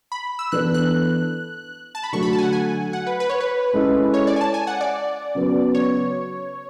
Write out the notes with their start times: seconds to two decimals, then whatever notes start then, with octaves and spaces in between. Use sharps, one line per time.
0.12 B5
0.39 E6
0.52 E3 B3 D4 A4 D5 F#6
0.74 F#6
1.95 A5
2.04 B5
2.13 D3 F#3 A3 C#6
2.23 B5
2.33 A5
2.38 G#5
2.43 F#5
2.53 G#5
2.93 F#5
3.07 B4
3.20 B4
3.30 C#5
3.41 B4
3.73 G#3 C#4 E4 A4
4.14 C#5
4.27 D5
4.36 G#5
4.41 A5
4.54 G#5
4.67 F#5
4.81 D5
5.35 C#3 F#3 B3
5.75 C#5